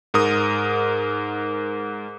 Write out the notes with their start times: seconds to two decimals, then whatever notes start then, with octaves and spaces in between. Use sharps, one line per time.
0.14 G#2 A#4 D#6